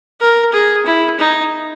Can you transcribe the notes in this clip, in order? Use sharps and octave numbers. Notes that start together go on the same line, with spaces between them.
A#4
G#4
E4
D#4